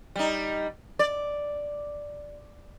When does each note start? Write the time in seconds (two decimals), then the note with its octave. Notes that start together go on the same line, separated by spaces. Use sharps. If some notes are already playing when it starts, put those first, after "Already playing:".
0.16 G3 D#4
0.99 D5